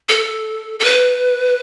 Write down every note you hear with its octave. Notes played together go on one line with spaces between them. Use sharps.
A4
A4
B4